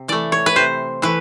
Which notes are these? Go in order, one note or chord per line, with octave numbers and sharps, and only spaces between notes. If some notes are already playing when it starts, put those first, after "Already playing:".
Already playing: C3
E3 A3 D5
C#5
B4
C3 C5
E3 A3 B4